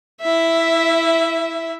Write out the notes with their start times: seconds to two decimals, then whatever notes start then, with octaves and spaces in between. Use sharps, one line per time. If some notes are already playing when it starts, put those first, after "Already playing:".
0.22 E4 E5